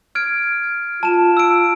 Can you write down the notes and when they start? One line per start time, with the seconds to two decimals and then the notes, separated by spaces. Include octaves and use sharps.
0.15 F6 G#6 D7
1.03 F4 A5 E7
1.37 E6 D7